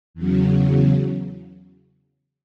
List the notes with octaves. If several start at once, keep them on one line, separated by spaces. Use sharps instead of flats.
E2 C#3 F#3